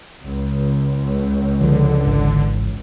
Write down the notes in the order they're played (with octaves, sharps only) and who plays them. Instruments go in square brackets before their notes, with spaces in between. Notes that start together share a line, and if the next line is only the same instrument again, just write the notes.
[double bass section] C#2
[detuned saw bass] D3 [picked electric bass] F3
[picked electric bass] G#1 E3